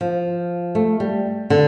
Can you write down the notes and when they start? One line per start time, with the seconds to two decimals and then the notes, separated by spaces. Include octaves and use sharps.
0.01 F3
0.75 A3
1.00 G3
1.50 D3